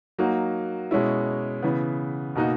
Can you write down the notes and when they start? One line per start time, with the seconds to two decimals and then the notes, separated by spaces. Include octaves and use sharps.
0.19 F#3 A#3 D#4 F#4
0.91 B2 G#3 C#4 E4
1.63 C#3 E3 B3
2.35 B2 A#3 D#4 F#4